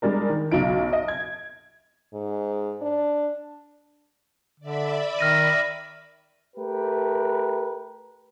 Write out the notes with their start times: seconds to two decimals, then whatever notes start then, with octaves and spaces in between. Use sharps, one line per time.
0.02 G3 G#3 D4 A#4
0.29 D#3
0.51 B1 C#3 F#3 D#4 D7
0.93 D#5
1.08 G#6
2.13 G#2
2.82 D4
4.60 D3 D5 E5 B5
5.19 D#3 F6 A#6 D#7
6.56 A3 G4 A#4 B4